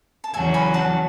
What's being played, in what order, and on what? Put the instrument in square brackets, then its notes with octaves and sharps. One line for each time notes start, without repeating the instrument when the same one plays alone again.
[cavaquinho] A5
[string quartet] E2 C#3 F#3 C#4 F#4 [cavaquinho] E5 G#5
[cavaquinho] G#5 B5
F#5 A5